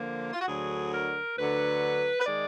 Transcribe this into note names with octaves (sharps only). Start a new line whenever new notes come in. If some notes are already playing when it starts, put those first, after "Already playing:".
Already playing: D3 F3 A#3
F4
F#4
D2 D3 F#3 G#4
A#4
D2 D3 F#3 B4
B4
D#3 G#3 D5